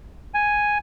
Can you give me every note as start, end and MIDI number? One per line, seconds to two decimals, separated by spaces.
0.34 0.78 80